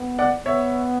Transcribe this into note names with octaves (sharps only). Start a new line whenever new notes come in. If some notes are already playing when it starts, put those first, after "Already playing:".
Already playing: B3
D5 F#5
B3 C#5 E5